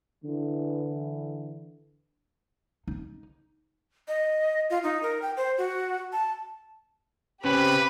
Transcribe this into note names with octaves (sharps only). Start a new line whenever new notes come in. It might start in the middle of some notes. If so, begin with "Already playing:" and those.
D3 E3
D#4
D#5
F4
D#4
A#4
G5
C5
F#4
A5
C#3 C4 G4 B4 B5